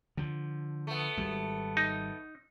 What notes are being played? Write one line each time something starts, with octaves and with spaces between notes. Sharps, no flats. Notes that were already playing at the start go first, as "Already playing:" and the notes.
D3 F3
A3 B3
G#1 G3
D#4